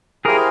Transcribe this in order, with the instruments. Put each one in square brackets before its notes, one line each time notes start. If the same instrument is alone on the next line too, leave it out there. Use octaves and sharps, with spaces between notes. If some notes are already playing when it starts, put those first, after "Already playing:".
[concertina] E4 G4 C5 F5 G#5 [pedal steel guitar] G#4 A#4